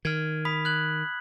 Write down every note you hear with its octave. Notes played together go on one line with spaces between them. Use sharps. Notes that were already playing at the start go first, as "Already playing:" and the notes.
D#3 F6 G#6
B5 D#6 B6
F#6 G#6 F#7